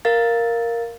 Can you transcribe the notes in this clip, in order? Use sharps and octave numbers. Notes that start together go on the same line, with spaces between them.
A#4 F5 A6